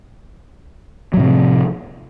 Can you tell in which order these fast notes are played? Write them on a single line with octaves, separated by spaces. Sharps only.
F#3 A2 C3 F3